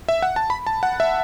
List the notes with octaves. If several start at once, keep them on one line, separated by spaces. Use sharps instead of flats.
E5
F#5
A5
B5
A5
F#5
E5